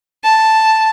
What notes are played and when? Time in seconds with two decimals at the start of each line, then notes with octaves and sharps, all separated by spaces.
0.24 A5